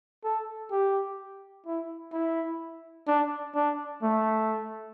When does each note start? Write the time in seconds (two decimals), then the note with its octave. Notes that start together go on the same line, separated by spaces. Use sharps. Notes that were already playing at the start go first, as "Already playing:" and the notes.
0.24 A4
0.71 G4
1.66 E4
2.13 E4
3.08 D4
3.55 D4
4.03 A3